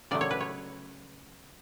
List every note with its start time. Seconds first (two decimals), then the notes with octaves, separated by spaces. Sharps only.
0.11 C#3 F#3 A3 D5
0.21 C#5
0.31 B4
0.40 C#5